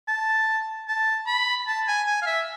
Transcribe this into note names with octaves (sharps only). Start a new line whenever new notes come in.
A5
A5
B5
A5
G#5
G#5
F5
E5